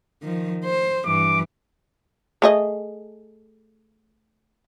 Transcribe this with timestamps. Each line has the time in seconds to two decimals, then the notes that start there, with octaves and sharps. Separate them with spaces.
0.23 D#3 F3
0.65 C5
1.06 G2 E3 D6
2.42 A3 G#4 D#5